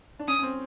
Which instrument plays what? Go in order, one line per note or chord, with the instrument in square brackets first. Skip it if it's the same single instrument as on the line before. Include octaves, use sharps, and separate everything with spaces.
[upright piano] D4
[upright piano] C#4 [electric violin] D#6
[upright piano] C#4
C4